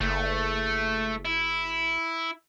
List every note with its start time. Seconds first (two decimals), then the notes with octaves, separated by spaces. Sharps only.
0.01 F#1 A3
1.25 E4